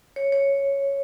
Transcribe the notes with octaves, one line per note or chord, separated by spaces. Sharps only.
C#5
C#5